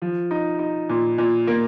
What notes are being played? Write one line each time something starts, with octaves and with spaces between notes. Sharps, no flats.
F3
D#4
D#4
A#2
A#2
A#3